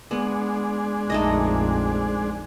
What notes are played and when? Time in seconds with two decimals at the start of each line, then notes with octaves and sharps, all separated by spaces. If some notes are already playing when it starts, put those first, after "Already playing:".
0.11 G#3 B3 D4
1.10 A#1 F2 A3 D#4 D#5